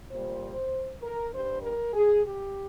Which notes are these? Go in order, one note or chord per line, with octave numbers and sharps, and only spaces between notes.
A#2 G3 C5
A#4
G2 G3 C5
A#4
G#4
G4